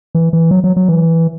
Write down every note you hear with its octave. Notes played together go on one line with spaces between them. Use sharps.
E3
E3
F#3
F#3
F#3
E3